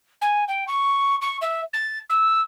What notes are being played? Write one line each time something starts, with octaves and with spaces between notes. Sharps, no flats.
G#5
G5
C#6
C#6
E5
A6
E6